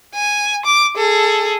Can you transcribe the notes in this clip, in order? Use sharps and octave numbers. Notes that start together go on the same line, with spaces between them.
G#5
D6
G#4 A4